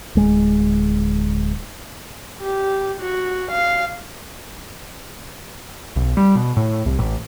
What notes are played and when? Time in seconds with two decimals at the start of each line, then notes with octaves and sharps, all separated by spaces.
0.15 D1 G#3
2.41 G4
3.00 F#4
3.51 F5
5.96 B1
6.17 G3
6.35 B2
6.57 A2
6.86 C2
6.99 A1